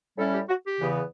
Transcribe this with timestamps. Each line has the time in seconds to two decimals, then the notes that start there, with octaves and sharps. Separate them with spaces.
0.18 A2 G3 C#4 E4 A4
0.33 G4
0.49 F#4
0.65 G4
0.80 E2 C#3 E3 B3